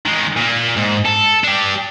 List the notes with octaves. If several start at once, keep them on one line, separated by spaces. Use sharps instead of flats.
D#3 G#3
A#2 A#3
G#2
A4
D4 G4